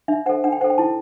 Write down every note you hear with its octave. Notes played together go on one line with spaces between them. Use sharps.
D4 E5
A4 C5 F#5
D4 F#5
G5
A4 C5 F#5
G5
E4 A5